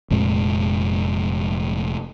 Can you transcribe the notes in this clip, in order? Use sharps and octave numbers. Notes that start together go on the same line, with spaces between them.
F1 F2 A#2 G#3